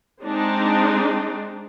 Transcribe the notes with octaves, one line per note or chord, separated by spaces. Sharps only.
G#3 C4 D4 D#4